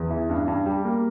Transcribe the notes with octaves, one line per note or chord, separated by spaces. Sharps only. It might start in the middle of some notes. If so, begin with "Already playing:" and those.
Already playing: E2
E3
G2
G2
G3
A#3